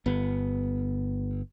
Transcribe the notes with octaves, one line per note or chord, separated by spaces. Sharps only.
G1 B3